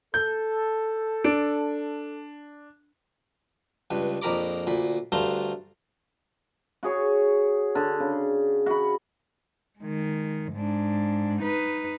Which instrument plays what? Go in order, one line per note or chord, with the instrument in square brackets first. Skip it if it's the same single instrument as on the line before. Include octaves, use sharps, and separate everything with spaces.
[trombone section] A4 [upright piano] G6
[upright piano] D4 D7
[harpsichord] C#2 G2 B4
A#1 F2 A#4 A#5 B5 D6
D2 A#2 B5
D2 G2 A3 F5 A#5 C6
[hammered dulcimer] F#4 G#4 C#5
D3
C#3
F#4 B5
[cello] D#3 G#3
G#2 D4
D#4 B4